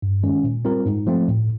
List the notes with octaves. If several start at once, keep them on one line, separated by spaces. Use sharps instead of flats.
G2
D#3 G#3 C#4
A#2
G3 C4 F4 A#4
G#2
F3 A3 C4
A2